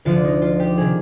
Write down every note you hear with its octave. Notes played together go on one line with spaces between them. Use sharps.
D2 D3 F3 F4
D#4
F4
G4
C3 D#3 G#4